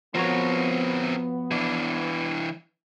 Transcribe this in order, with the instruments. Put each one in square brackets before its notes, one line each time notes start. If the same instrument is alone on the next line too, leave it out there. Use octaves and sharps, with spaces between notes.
[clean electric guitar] F3 F#4 C#5 [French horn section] B3 [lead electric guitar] C4 A#4
[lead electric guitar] E3 D4